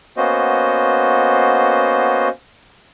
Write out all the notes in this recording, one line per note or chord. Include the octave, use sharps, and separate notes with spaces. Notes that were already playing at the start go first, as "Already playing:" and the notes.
A#3 B3 C#4 F#4 C5 D#5